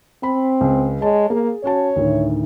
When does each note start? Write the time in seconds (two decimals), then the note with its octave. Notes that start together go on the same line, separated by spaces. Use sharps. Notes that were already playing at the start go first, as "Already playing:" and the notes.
0.23 C4 B5
0.61 C#2
1.02 G#3 C#5 A5
1.30 A#3 G#4
1.64 C#4 F#4 C#5 A5
1.96 D2 A2 D#3